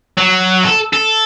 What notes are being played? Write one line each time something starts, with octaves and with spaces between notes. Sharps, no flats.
F#3
A4
A4